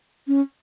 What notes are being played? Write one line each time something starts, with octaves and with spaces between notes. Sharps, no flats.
C#4